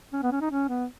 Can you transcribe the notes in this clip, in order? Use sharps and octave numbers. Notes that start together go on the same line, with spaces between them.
C#4
B3
C#4
D#4
C#4
B3